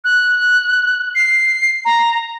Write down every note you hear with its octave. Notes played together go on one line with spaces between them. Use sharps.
F#6
C7
A#5